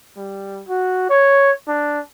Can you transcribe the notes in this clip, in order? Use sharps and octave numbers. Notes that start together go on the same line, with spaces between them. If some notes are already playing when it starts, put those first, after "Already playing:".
G3
F#4
C#5
D4